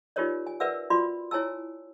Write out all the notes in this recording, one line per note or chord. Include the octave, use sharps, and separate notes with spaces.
D#4 F4 G4 A#4 C#5 D5
G#5
A#4 B4 D5 E5 F#5 E6
F4 F#4 D5 B5 C6
E4 C#5 G#5 A5 E6